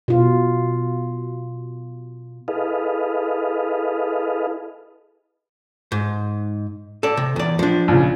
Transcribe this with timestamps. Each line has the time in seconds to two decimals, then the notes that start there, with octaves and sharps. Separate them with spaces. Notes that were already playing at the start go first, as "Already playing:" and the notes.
0.08 B2 F4
2.48 E4 G#4 A4 B4 D#5 F5
5.92 G#2
7.03 A4 D5
7.17 C3
7.36 E2 D5
7.59 F3 D4
7.88 A#1 C#3